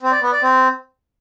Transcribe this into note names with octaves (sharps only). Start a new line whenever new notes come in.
C4
D5
B3
D5
C4